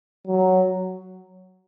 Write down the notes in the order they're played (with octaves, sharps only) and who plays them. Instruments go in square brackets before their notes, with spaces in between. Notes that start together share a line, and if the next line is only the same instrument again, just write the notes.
[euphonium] F#3